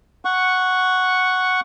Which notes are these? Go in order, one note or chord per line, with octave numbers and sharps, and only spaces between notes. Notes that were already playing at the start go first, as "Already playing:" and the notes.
F#5 C#6